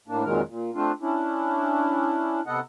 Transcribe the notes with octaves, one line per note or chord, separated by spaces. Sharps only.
A2 A#3 D4
F2 A#2 D#3 F#3 G#3 A#4
A#2
A3 C4 D4 F4
C#4 D4 E4
C3 B3 A4 D#5 F#5